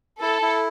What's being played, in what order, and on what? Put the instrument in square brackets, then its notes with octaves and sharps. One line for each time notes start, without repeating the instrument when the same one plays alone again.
[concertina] E4 [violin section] A4
[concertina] E4